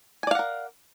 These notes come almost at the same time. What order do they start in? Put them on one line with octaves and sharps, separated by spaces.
G#5 D5 F5 F#5 A#4